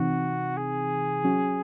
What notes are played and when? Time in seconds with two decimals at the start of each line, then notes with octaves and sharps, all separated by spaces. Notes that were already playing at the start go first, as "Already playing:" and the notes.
Already playing: C3 E3 C4 D#4 F#4
0.57 G#4
1.24 F#3 C#4 F#4